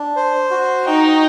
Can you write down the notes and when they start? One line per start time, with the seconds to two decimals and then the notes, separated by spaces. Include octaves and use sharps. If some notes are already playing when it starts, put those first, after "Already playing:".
Already playing: D4
0.16 C5
0.51 F#4
0.86 D#4 G5